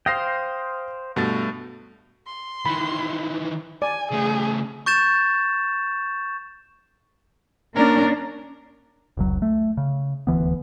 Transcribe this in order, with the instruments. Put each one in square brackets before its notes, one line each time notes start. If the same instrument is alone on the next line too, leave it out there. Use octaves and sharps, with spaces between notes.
[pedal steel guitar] C5 F5 G5 [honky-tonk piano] D#6 A#6 C7
[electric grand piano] G2 A3 A6 [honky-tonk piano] B2
[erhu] C6
[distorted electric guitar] D#3 E3 [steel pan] B5
[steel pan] D5 [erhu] G#5
[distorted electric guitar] C#3 A3 [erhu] G#4
[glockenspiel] C#6 G6 A6 E7
[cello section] A#3 C#4 D4 [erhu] A#4
[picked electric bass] F1 C#2 F#3
A3
C#3
D#1 D2 E3 B3